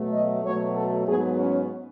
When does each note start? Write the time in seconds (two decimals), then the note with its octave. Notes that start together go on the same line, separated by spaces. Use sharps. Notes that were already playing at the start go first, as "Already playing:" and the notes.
Already playing: B2 F#3 A3
0.13 D#5
0.44 B2 F#3 A3 C#5
0.74 A4
1.06 G#2 F#3 B3 G#4
1.36 C#4